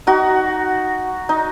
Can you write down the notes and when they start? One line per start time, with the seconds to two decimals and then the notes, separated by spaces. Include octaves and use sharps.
0.07 D#4 F#4
1.29 D#4